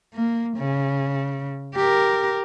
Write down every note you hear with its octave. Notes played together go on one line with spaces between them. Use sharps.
A#3
C#3
G4 A#4